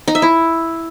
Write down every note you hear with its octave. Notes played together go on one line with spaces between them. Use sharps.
D#4
E5
E4